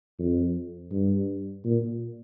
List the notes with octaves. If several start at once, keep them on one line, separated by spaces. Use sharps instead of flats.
F2
G2
A#2